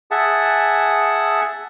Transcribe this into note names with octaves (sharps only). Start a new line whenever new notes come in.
G#4 E5 F#5 A5